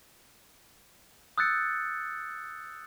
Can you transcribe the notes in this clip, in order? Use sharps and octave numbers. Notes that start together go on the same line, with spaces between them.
D#6 E6 F#6 G6 A6 C#7